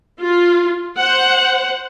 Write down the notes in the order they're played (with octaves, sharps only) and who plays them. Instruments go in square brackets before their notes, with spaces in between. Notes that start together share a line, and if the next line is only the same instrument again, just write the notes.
[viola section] F4
C5 F#5